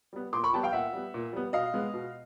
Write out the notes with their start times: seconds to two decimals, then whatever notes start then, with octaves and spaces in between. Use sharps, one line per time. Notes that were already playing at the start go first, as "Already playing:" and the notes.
0.13 G3 B3
0.33 A#2 C6 D6
0.44 B5 C#6
0.53 G3 B3 G5 A5
0.63 F5 G5
0.73 A#2 E5 F#5
0.93 G3 B3
1.14 A#2
1.33 G3 B3
1.53 B2 D#5 F5
1.74 G#3 B3
1.94 B2